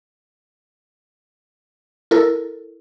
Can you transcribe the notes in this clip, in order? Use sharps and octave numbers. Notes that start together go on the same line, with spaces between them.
E4 A4 A#4